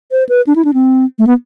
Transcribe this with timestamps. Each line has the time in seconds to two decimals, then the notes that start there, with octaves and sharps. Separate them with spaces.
0.11 C5
0.29 B4
0.47 D4
0.56 E4
0.65 D4
0.74 C4
1.18 A3
1.27 B3